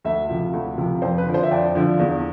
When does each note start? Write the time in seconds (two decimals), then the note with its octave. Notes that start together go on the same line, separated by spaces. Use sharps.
0.04 D2 E5
0.29 C3 F3
0.53 D2
0.78 C3 F3
1.02 F2 C5
1.18 B4
1.26 D3 F3
1.34 C5
1.43 E5
1.51 F2 D5
1.75 D3 F3
1.99 E2